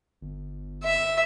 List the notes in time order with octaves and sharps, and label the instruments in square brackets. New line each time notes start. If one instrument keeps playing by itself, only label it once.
[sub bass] G1
[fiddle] E5